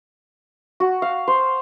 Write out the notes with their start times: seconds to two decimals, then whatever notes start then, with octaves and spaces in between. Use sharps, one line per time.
0.80 F#4
1.02 F5
1.28 C5